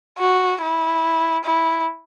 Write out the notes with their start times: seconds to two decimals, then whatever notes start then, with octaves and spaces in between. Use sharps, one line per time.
0.18 F#4
0.62 E4
1.45 E4